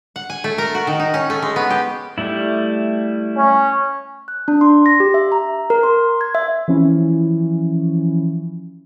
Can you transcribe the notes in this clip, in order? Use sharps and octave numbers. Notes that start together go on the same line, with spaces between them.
F#5
G#5
A3
A#4
F#4
D#3
D#4
C#4
A3
G#3
B3
G4
G3 A3 E4
C#4
F#6
D4
C6
A#6
G4
E5
A#5
A#4
C6
G#6
E5
E3 F3 C#4 E4